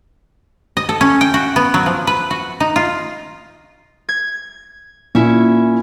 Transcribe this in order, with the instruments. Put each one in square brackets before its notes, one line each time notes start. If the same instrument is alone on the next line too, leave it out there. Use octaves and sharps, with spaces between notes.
[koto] D#5
A4
C#4
G5
F#4
B3
F#3
F3
B4
F#4
D#4
F4
[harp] G#6
[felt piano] A#2 [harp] C#4 E4